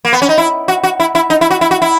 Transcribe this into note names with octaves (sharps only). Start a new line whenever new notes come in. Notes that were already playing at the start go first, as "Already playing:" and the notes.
A#3
B3
C#4
D#4
E4
F#4
F#4
E4
E4
D#4
E4
F#4
E4
F#4
E4